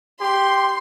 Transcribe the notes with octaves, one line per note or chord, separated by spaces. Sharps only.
G4 C6